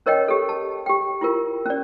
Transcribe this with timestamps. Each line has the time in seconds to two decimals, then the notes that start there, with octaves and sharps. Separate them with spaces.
0.06 C#4 A#4 C#5 D#5 G5
0.28 G4 A4
0.49 A5
0.86 G4 G5
1.21 E4 F4 A#4
1.66 C#4 D5